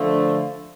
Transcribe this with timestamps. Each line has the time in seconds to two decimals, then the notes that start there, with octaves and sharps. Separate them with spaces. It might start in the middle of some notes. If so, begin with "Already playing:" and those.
Already playing: D3 F3 A3